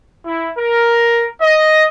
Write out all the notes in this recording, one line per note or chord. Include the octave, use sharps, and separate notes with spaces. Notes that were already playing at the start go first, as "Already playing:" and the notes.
E4
A#4
D#5